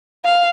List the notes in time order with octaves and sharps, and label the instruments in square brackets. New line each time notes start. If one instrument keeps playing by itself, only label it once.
[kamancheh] F5